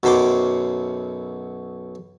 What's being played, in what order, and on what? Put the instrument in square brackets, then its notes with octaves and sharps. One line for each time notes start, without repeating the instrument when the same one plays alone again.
[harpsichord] B1 F#2 B2 C5 G5 D6